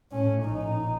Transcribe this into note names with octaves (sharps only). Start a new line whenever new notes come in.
A2 C#4
A#1 D#4